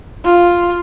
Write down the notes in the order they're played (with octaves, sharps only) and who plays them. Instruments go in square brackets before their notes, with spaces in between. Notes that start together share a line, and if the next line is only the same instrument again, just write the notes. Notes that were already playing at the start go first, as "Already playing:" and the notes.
[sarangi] F4